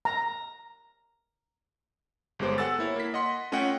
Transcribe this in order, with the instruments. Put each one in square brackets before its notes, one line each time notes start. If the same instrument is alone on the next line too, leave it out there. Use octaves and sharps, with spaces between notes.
[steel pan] A#5
[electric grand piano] G1 G#3 B3 G4 C5
A4 F#5 G#5 E6 A6
A#3 E4 C#5
A#3 B6
D#5 F#5 C6
A3 C#4 F4 D#5 F#5 G5